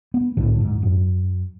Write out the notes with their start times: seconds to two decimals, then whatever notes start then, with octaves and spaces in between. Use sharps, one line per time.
0.14 B3
0.37 C2 A2 D3
0.61 D1 G1 G#2
0.83 F#2